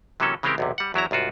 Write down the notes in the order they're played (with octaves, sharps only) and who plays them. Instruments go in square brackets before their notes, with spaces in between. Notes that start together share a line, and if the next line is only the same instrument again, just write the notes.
[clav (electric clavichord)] C3 E3 F#3 A#3 C#4 A4
C#3 E3 G#3 C4 G4 A#4
B1 E2 C3
G3 F#5
E2 F#3 E4 A#5
C2 G#2 F4 F#4